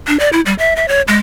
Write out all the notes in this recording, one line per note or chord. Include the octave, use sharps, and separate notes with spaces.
D4
D5
E4
G3
E5
E5
C#5
G#3